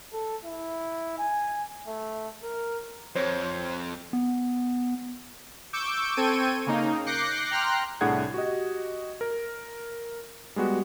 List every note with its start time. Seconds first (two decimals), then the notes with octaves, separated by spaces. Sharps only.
0.13 A4
0.45 E4
1.18 G#5
1.87 A3
2.43 A#4
3.15 F2 C5 C#5
4.13 B3
5.73 C#6 D6 E6 G6 D7
6.17 C4 A4 G5 C#6 G#6 D#7
6.66 C#3 A#3 D#4
7.06 D6 F#6 G6 A#6 C7 C#7
7.51 G5 A#5 C6 F6 F#6
8.01 C2 A2 D4 G#4 F#5 G#6
8.34 F#4 G4 D#5
9.21 A#4
10.56 G3 G#3 B3 F#4